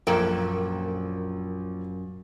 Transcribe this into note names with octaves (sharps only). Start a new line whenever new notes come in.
A#1 F#2 A#3 A4 A#4 G5